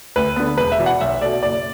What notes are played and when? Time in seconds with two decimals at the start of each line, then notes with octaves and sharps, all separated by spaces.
0.16 D2 B4
0.36 D3 B3
0.58 E1 B4
0.72 E5
0.79 E2 B2
0.86 F#5
1.01 B1 E5
1.22 B2 A3 D5
1.43 F#1 D5